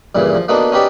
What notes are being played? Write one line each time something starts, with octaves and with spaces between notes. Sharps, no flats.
G2 A#2 C#3 E3
F3
A#3 B3 D4 D#4 F#4 A4
C#4 D#4 F#4 G4 B4 D5